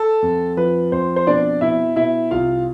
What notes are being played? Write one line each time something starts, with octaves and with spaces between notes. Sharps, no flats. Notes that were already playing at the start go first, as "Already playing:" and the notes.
Already playing: A4 A5
F2
F3 B4
F2 C5
C5
B2 D4 D5
B2 E4 E5
B2 E4 E5
C2 F4 F5